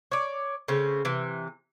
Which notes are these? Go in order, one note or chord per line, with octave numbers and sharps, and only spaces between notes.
C#5 D5
C#3 A3 C4 C#4
C3 E3